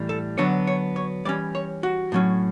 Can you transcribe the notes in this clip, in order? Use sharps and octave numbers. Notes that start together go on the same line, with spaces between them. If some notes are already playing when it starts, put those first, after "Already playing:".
Already playing: A2 E3 G3
A4
D3 F#3 B3 D4 C#5
C#5
C#5
E3 G3 C#4 D5
C#5
F#4
A2 F#3 C#4